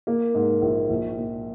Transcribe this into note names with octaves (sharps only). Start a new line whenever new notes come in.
A#3
G#2
A#1
A#1
A#2